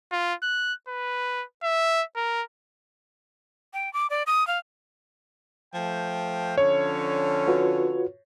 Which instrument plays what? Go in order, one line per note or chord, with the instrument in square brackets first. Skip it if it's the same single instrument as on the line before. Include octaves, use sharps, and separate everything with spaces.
[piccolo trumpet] F4
F#6
B4
E5
A#4
[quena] G5
D6
D5
D#6
F5
[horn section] F3 A3 G5
[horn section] D3 F3 C#4 [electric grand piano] C#5
[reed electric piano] F4 F#4 B4